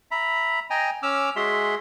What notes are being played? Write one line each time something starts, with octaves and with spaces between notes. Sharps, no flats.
E5 A#5 B5
D#5 G5 G#5 A#5
C#4 D6 E6 F6
G#3 F#4 G#4 E5 C6